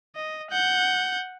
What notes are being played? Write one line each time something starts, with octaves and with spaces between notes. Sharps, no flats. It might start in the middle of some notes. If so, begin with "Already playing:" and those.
D#5
F#5 G6